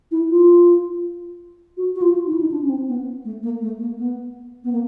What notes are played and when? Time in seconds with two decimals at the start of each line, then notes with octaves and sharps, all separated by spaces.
0.11 E4
0.30 F4
1.77 F#4
1.96 F#4
2.02 F4
2.26 D#4
2.33 E4
2.40 D#4
2.51 D4
2.62 C#4
2.69 C4
2.88 B3
3.25 A3
3.43 A#3
3.62 A3
3.80 A#3
3.98 B3
4.64 B3
4.72 A#3